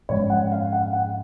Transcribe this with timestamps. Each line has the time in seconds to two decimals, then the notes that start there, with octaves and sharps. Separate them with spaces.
0.09 G#2 F3 G#3 C#4 C#5
0.30 F#5
0.52 F5
0.72 F#5
0.93 F#5